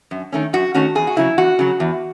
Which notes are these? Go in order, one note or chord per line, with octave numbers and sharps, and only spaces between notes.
F#2
D#3 A3 C#4
F#2 F#4
D#3 A3 C#4 F#4
E2 G#4
F#4
C#3 F#3 E4
E2 F#4
C#3 F#3
E2